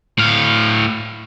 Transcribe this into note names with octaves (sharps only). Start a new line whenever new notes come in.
A2 F5